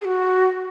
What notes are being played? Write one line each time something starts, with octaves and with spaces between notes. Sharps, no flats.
G#4
F#4